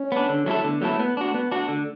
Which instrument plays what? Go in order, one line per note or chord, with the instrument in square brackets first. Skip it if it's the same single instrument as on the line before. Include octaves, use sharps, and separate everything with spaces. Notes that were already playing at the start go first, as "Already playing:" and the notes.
Already playing: [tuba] C#4
[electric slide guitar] B3 D4
D3
F#3 A3 E4 A4
[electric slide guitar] D3 [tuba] B3
[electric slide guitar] F#3 A3 E4 A4
[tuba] A3 [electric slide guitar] B3
[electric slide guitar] D4 F#4
[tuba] A3 [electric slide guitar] B3
[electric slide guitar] D4 F#4
D3